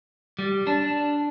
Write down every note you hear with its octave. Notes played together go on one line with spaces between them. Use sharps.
G3
D4